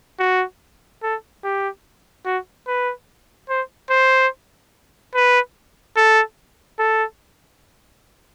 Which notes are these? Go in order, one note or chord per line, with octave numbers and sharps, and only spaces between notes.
F#4
A4
G4
F#4
B4
C5
C5
B4
A4
A4